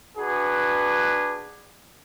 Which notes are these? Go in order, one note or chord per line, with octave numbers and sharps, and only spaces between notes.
D4 F#4 G#4 B4